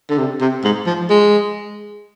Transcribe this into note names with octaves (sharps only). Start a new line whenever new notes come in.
D3
C3
C3
G#2
F3
G#3